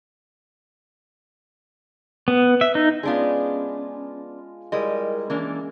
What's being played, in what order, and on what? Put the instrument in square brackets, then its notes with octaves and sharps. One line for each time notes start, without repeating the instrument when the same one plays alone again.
[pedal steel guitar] B3
E5
D#4
[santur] G#3 F4 [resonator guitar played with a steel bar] B3 D4 G#4 [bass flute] C#4
[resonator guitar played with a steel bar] G3 E4 D#5 [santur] G#3 [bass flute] A#4
[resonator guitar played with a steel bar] E3 A#3 D4 [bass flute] C#4